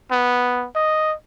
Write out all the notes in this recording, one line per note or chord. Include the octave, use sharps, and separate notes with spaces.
B3
D#5